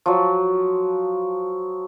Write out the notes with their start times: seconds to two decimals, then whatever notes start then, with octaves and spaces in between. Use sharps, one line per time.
0.06 F3 F#3